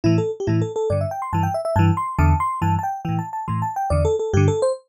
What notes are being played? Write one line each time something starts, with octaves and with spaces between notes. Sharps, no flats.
A2 E3 E4
A4
G4
A2 E3 E4
A4
A4
G2 D3 D5
E5
G5
C6
G2 E3 A5
G5
E5
E5
G2 E3 A5
C6
E2 D3 A5
C6
G2 E3 A5
A5
G5
A2 E3 G5
A5
A5
A2 E3 C6
A5
G5
E2 D3 D5
A4
A4
G2 D3 G4
A4
C5